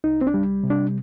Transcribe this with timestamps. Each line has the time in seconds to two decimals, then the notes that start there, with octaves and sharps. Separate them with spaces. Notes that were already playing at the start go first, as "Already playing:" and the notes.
0.04 C2 D#4
0.21 C4
0.27 D4
0.34 G3
0.63 C3
0.70 D4